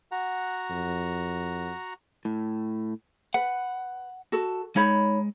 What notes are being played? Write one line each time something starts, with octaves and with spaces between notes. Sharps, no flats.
F#4 F#5 A#5
F2
A2
B4 F#5
F#4 A4
G#3 D#4 C#5 B5